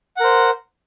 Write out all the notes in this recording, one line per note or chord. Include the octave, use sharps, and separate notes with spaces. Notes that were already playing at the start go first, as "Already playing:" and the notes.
A#4 C5 F#5